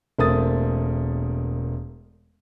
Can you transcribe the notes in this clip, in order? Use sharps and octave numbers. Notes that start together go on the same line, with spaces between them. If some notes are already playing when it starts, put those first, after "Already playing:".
E1 A3 A#3 C4 D#6 A6